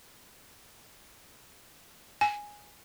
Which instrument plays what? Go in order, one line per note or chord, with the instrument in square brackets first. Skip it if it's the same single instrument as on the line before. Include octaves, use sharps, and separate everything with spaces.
[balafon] G#5